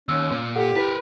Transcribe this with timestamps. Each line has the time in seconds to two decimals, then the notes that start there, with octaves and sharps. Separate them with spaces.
0.09 D#2 C#4 E6
0.31 A#2
0.55 G4 A4 F#5
0.76 E4 A#4 B4 B6